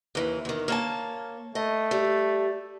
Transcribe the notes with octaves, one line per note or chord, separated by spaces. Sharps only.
D#2 E3
E2 D#3
A#3 C#5 A5
A3 D#5
G3